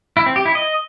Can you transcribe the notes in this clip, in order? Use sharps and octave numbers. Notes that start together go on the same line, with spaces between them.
E4
C4
G4
E4
D#5